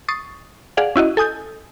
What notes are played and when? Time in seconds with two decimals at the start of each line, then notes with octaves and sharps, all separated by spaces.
0.08 C#6 D#6 A6 C7
0.77 G#4 D5 F5 F#5
0.96 C#4 E4 F#4 D#5
1.17 A4 G#5 D#6 G6